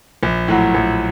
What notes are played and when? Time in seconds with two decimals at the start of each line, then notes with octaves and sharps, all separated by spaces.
0.23 A#1
0.48 A2 F#3
0.74 A#1